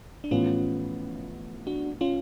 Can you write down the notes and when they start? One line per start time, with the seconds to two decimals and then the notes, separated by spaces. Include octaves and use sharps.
0.24 D4
0.31 A1 A2 F3 B3 C#4 F4
1.67 D4 F#4
2.01 C#4 F4